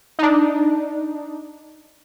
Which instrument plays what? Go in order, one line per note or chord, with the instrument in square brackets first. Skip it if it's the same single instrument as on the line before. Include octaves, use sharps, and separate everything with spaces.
[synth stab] D4 D#4